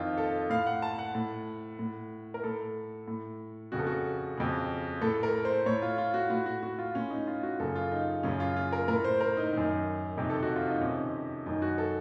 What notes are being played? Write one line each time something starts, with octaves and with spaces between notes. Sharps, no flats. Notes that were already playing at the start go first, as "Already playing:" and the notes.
Already playing: F2 D#3 F4
A4
A2 F5
F#5
A5
F#5
A2
A2
A#4
A2 A4
A2
F2 C#3 F#4
A4
F#4
F2 C#3
A2 A4
A#4
C5
A2 C#5
F4
F4
F#4
A2 F#4
F#4
F#4
F4
A2 C#4
D#4
F4
F#4
F#2 C#3 A4
F4
D#4
F#2 C#3 C#4
F4
F4
A#4
A2 A#4
C5
A#4
D#4
F#2 D#3
F2 C3 D#3
A4
F#4
F4
D#4
F2 C3 D#3 C#4
F#2 D#3 D#4
F#4
A4